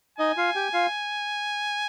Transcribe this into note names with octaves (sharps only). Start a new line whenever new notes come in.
D#4 D#5 G#5
F4 F5
G4 G5
F4 F5